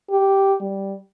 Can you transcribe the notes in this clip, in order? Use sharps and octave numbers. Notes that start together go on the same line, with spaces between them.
G4
G3